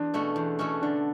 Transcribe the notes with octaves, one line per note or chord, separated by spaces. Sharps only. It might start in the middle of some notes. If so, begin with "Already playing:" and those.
Already playing: E2 D4
B2 A3 C#4 F#4
E2
B2 A3 C#4 F#4
D3 D4